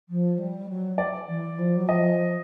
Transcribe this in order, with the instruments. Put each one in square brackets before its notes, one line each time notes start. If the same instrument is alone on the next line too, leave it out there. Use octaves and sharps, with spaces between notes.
[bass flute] F3
G3
F#3
[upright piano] D5
[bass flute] E3
F3
F#3
[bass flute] F3 [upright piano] D#5